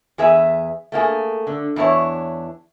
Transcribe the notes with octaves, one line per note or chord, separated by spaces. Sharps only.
E2 G#4 B4 E5
A3 A#3 G4 G#4
D3
E2 D4 E4 B4 C#5